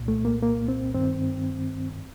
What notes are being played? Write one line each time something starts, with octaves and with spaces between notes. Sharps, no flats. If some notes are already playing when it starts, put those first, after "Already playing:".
Already playing: C2 A#2
A3
A#3
A#3
C4
G2 D#3 C4